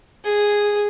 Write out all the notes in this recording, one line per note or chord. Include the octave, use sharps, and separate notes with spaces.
G#4